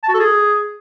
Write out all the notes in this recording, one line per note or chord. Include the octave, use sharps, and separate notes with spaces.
A5
F#4
A4
G#4